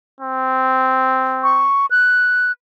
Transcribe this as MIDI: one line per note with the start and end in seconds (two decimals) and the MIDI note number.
0.20 1.67 60
1.43 1.86 85
1.91 2.52 90